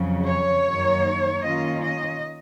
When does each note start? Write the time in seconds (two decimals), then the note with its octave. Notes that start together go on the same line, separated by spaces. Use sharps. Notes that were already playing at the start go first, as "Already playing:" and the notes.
Already playing: F2 C#3 F#3
0.27 C#5
0.66 F#2 D#3 F#3 A#3 D#4
1.43 D#3 A#3 C#4 F4 D#5
1.82 D#5